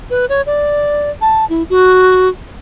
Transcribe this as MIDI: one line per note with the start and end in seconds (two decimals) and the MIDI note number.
0.10 0.26 71
0.29 0.42 73
0.46 1.10 74
1.21 1.45 81
1.50 1.63 64
1.70 2.29 66